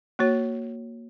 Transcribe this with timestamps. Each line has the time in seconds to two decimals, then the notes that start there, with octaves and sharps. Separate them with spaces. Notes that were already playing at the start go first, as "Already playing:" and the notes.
0.19 A#3 F#4 C#5